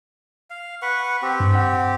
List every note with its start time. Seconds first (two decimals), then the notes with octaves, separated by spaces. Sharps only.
0.50 F5
0.82 B4 F#5 C#6
1.22 C4 G4
1.40 G2
1.55 F#5